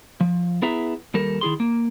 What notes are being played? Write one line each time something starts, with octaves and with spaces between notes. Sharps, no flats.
F3
B3 E4 G#4 B4 E5 A#5
D#2 G3 A4 A#4
D#3 E4 G#4 C6
A#3